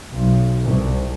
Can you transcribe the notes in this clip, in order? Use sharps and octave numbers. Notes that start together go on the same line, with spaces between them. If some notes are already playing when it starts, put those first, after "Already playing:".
B1
C2